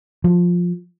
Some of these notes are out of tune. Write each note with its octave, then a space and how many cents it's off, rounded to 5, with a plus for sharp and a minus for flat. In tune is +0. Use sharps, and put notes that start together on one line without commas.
F3 +10